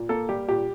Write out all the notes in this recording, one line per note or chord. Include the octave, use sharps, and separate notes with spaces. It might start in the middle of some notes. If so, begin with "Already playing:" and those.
Already playing: A#2
A#3 A4
G3 G4
A#2 G4